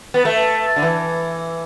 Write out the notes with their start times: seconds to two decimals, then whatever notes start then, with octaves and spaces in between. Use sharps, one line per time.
0.14 B3
0.25 A3
0.76 D3
0.82 E3